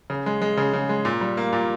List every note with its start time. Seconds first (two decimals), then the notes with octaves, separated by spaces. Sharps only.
0.10 C#3
0.26 G#3
0.42 G#3
0.57 C#3
0.73 C#3
0.89 G#3
1.05 A#2
1.21 G3
1.37 A#3
1.53 A#2